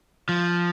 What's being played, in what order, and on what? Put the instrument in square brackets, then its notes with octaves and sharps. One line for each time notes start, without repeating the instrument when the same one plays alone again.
[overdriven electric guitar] F3